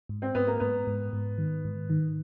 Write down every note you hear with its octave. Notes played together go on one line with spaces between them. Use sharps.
G#2
C4
G#2 B3
A#3
G#2 B3
G#2
G#2
D#3
G#2
D#3